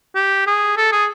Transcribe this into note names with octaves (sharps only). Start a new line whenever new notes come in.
G4
G#4
A4
G#4